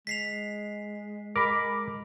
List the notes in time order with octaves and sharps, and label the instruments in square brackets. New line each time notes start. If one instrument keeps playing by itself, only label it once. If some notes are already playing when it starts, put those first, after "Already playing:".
[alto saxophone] G#3 [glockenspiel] B6 C7 F7
[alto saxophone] G#3 [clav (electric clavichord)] A#4 [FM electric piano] B5 D6